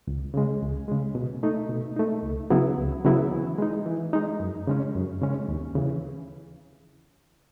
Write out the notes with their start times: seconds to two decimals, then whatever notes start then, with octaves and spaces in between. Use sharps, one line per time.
0.07 C#2
0.34 C#3 G#3
0.62 C#2
0.88 C#3 G#3
1.15 B2
1.43 A3 D#4
1.70 B2
1.96 A3 D#4
2.23 C#2
2.50 C#3 F#3 B3 E4
2.78 C#2
3.05 C#3 F#3 B3 E4
3.31 E3
3.58 G#3 D#4
3.86 E3
4.13 G#3 D#4
4.40 F#2
4.67 C#3 G#3 C#4
4.95 F#2
5.21 C#3 G#3 C#4
5.48 D#2
5.75 C#3 E3